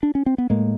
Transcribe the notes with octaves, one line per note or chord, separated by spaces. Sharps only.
D4
C#4
C4
B3
A2 G#3 A#3